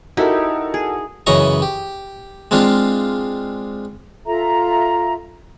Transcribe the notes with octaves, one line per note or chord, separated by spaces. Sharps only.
D#4 E4 F#4 G4 A4 A#4
G#4
F#2 C#3 E3 D#5 A#5 C#6
G4
G#3 C4 D4 F4 F5
F4 A4 E5 A#5